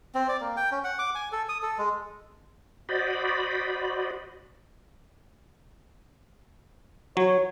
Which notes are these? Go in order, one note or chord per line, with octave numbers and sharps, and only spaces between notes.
C4
D5
A#3
G5
C#4
F#5
D6
G#5
A4
D#6
A4
G#3
F#4 C5 D5 D#5 B5
F#3 C#5